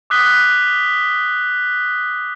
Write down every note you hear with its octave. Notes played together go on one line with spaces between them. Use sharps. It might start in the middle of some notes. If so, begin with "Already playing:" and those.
D6 D#6 F#6 B6 G7